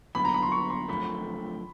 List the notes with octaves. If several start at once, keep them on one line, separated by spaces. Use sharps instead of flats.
G2 D3 F#3 B3 B5
A#5
B5
C6
C#6
C6
F#2 D3 F3 A3 C4 B5